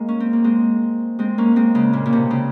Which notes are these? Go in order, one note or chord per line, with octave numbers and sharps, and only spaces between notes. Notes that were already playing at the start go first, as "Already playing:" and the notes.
Already playing: G#3 A#3
C#4
C4
A#3
G#3 C4
G#3 C4
A#3 C#4
G#3 C4
C#3
A#2
A#2
C3
C#3